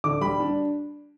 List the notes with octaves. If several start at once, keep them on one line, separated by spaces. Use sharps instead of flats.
D3 D6
G3 B5
D4